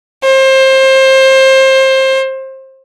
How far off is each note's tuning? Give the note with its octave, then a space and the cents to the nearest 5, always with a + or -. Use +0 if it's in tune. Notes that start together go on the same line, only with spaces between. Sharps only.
C5 +25